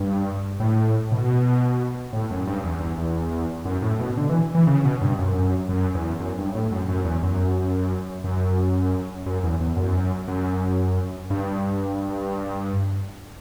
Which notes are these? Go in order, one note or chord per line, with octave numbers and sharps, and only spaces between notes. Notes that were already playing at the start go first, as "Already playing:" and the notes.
Already playing: G2
A2
B2
A2
F#2
G2
E2
E2
E2
F#2
A2
B2
D3
E3
E3
C#3
B2
G2
F#2
F#2
E2
F#2
G2
A2
F#2
F#2
E2
F#2
F#2
F#2
E2
E2
F#2
F#2
G2